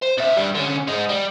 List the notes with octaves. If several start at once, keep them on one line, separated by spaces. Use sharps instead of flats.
C5
B2 E5
G2 G3
D3 C#4
G#3 D#4
G3